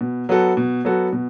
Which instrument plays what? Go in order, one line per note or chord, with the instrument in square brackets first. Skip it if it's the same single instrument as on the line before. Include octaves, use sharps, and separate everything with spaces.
[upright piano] B2
F#3 B3 F#4 A4
B2
F#3 B3 F#4 A4
B2